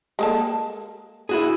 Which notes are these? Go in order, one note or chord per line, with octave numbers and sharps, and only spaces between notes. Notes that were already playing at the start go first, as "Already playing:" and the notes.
G#3 A#3 A4
E4 F#4 G#4